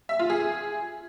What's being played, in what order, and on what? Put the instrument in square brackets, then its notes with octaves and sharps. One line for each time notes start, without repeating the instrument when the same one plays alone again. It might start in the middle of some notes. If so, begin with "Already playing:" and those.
[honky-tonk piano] E5
F4
G#4